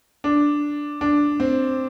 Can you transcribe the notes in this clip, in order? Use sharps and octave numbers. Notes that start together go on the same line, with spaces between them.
D4
D4
C4